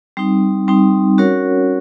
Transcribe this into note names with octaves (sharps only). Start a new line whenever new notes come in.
G3 C4 D#4
G3 C4 D#4
C#4 F#4 A#4 C#5 F#5